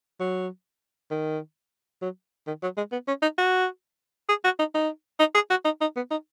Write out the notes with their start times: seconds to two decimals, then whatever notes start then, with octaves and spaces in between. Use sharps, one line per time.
0.20 F#3
1.11 D#3
2.02 F#3
2.47 D#3
2.63 F#3
2.77 G#3
2.92 B3
3.08 C#4
3.22 D#4
3.38 F#4
4.29 G#4
4.45 F#4
4.59 D#4
4.75 D#4
5.20 D#4
5.35 G#4
5.50 F#4
5.65 D#4
5.81 D#4
5.96 B3
6.11 D#4